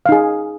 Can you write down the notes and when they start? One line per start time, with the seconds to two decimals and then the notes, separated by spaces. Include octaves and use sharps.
0.06 F5
0.09 D#4
0.12 G#4